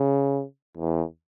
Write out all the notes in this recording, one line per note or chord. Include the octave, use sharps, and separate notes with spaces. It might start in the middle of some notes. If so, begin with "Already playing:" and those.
Already playing: C#3
E2